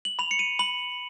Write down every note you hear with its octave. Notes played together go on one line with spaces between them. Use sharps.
F#7
B5 F7
C#7
D#7
B5 F#7